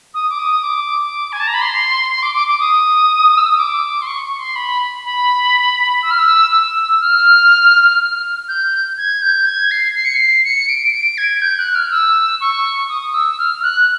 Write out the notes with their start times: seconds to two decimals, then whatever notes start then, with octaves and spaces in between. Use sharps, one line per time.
0.14 D#6
0.29 D6
0.39 D#6
0.63 D6
1.32 G#5
1.40 A5
1.47 A#5
1.54 B5
1.61 C6
2.11 C6
2.22 D6
2.35 D6
2.48 D6
2.60 D#6
3.37 E6
3.48 D#6
3.58 D6
4.02 C6
4.07 C#6
4.23 C#6
4.39 C6
4.55 B5
5.05 B5
6.03 E6
6.11 F6
6.19 E6
6.52 E6
7.01 F6
8.48 G6
8.97 G#6
9.22 G6
9.46 G#6
9.71 C7
9.95 C7
10.05 C#7
10.15 C7
10.44 C#7
10.69 D7
10.93 D7
11.17 G#6
11.42 G6
11.59 F#6
11.75 F6
11.91 E6
12.40 C#6
12.89 D#6
13.14 E6
13.39 F6
13.63 F#6